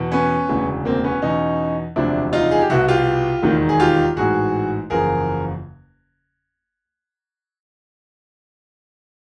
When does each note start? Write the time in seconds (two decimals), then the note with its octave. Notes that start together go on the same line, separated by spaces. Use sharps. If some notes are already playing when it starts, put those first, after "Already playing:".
Already playing: E2 B2
0.12 B3 C#4
0.49 E1 D2 C#3 E3
0.85 A#3 C4
1.04 B3 C#4
1.22 E2 B2 C#4 D#4
1.96 E1 D2 C3 F3 D4 E4
2.33 D#4 F4
2.51 G#4
2.61 G4
2.70 C2 B2 E4 F#4
2.88 F4 G4
3.43 E1 D#2 D#3
3.69 G#4
3.80 F4 G4
4.16 A1 G#2 E3 F#4 G#4
4.90 F#1 E2 C#3 F3 G#4 A#4